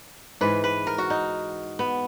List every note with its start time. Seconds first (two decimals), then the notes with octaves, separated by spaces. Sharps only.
0.41 G#2 E3 B4
0.64 B4
0.87 A#4
0.98 F#4
1.10 D#4
1.79 B3